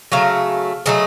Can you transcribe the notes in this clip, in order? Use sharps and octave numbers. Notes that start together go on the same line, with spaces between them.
C#3 F#3 A3 F5
C#3 F#3 A3 D#5